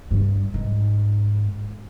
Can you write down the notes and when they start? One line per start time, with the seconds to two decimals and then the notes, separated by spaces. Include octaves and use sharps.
0.11 G2
0.54 G#2